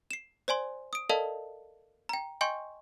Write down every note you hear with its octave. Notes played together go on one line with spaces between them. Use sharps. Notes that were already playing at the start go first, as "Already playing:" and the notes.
C7 E7
C5 D5 G#5 C6
D#6 D7
A4 A#4 D5 D#5 F5 A5
G5 A#5
D#5 G5 G#5 C6 C#6 G6